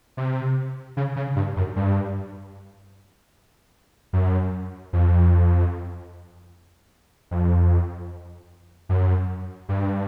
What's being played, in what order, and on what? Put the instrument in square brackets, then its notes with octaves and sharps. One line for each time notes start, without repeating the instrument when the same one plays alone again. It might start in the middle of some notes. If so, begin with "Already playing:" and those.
[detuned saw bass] C3
C#3
C#3
G2
F#2
G2
F#2
F2
F2
F#2
G2